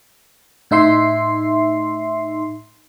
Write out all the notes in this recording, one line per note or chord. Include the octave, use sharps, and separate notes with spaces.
A2 D#4 E5 C6 C7